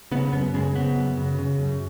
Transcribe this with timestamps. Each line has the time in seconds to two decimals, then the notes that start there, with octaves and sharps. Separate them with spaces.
0.11 C#3 B3
0.33 F#2 B3
0.54 C#3 G#3
0.75 C#3 B3
0.96 F#2
1.17 C#3
1.38 C#3
1.59 F#2